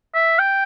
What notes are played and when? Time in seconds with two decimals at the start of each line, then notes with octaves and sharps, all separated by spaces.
0.14 E5
0.39 G5